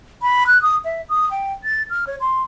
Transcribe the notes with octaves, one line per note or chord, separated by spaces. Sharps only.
B5
F#6
D#6
E5
D#6
G5
A6
F6
C#5
C6